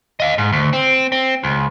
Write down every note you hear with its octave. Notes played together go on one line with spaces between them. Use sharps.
D#5 F5
G#2
D2
C4
C4
C#2